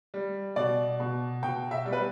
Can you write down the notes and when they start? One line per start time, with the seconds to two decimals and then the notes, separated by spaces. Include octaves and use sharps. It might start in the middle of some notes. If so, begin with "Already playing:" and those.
0.14 G3
0.56 B2 D5
1.00 B2
1.43 B2 G5
1.71 E5
1.86 G3
1.93 B4